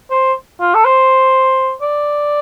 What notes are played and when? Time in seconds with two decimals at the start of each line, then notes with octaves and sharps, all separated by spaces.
0.11 C5
0.60 F4
0.75 A4
0.85 C5
1.82 D5